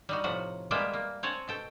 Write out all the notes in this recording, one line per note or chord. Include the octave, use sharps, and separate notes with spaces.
G3 D#4 F#4
A2 C3 F3 F#4 F#5
G3 G#3 A#3 B3 G4 E5
A#3
C4 C#5 F#5 G#5 A5
B2 A4 G5